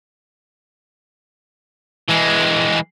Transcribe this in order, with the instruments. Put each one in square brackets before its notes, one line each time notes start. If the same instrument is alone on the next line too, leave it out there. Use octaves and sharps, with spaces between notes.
[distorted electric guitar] E3 G#3